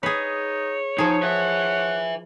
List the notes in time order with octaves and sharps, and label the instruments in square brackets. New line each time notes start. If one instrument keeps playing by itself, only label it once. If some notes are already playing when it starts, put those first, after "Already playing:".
[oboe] D#4 [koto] G#4 B4 [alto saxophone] C#5
[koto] F3 G#4 [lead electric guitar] D#4 [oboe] G#5
[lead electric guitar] B4 E5 [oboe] F#5